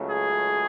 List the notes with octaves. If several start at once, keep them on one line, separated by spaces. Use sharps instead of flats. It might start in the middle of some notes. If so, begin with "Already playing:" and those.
Already playing: C#2 C#3 F#3 A3
G#4